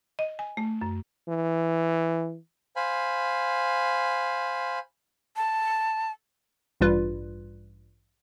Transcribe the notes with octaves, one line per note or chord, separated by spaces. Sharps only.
D#5
G#5
A3
F#2
E3
C5 F5 G#5 B5
A5
A1 G2 G3 F4 B4